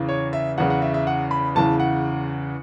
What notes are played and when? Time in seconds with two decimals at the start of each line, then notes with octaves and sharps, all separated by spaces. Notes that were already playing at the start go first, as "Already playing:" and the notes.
Already playing: E2 C#3 E3
0.09 C#5
0.33 E5
0.58 E2 C#3 E3 F#5
0.70 F#5
0.82 E5
0.94 E5
1.07 F#5
1.31 B5
1.55 E2 C#3 E3 A5
1.80 F#5